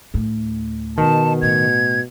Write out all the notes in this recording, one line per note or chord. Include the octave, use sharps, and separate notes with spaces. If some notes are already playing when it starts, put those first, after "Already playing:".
D2 A2
B2 D#3 A5
A2 G#6